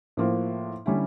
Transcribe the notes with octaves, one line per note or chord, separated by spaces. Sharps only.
A2 F3 A#3
D3 G3 C#4 E4